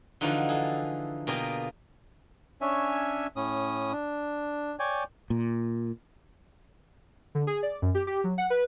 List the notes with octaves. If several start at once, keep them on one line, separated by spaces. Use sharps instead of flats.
D3 E3 F3 D#4 F4 F#4
G#4 A4
B2 A#3 F4 G#4 D5 G5
C#4 D4 C#5 E5 G#5
A2 C#4 D#6
D4
C#5 D5 G5 G#5
A#2
D3
G#4
D5
F#2
G4
G4
F#3
F#5
B4